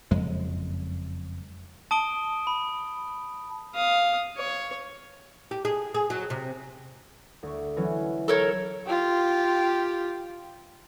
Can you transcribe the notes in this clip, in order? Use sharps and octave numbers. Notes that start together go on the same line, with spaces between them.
F#1 F2 G#3
A5 D#6 D7 G7
B5
F5 D#6
C#5
G4
G#4
G#4
F#3
C3
D2 C#6
E3 F#3 C#4
A4 A#4 C#5
F4 G4